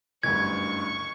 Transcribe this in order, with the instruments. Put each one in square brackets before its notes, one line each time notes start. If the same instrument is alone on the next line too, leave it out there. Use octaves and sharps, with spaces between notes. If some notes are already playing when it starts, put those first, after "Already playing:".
[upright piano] F#1 D2 G2 [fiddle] C#6 [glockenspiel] G#6